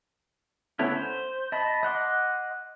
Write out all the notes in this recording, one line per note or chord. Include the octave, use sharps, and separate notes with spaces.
D3 A3 B3 C#4 E4
C5
D#5 A5 B5
D#5 F#5 C6 D6